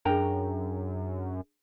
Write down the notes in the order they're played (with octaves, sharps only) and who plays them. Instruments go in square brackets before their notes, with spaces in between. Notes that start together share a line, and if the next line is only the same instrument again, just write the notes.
[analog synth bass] F#2 [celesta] D4 G#4 [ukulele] A#4 G5 A#5